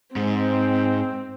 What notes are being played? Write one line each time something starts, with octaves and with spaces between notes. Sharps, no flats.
G#2 C4